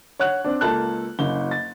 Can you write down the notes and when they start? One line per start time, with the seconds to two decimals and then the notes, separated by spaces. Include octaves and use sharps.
0.20 C#5 F#5 F#6
0.45 C4 D4
0.61 C#2 A#3 A4 A5 F#6
1.19 F#1 C#3 G7
1.51 A6